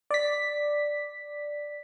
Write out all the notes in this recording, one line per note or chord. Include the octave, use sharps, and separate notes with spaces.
D5 B6